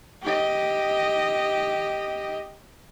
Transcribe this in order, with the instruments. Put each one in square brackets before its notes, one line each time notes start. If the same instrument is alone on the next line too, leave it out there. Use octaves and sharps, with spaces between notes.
[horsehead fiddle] G4 D#5